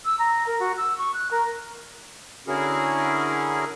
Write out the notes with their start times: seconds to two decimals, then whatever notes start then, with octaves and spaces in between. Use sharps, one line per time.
0.05 E6
0.19 A#5
0.46 A#4
0.60 F#4
0.77 E6
0.98 C#6
1.14 F#6
1.31 A#4
2.47 D3 C#4 E4 F#4 G#4 A#4